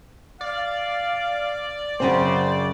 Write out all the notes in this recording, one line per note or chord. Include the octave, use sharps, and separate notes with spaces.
D5 F5
F#2 C#3 C4 C5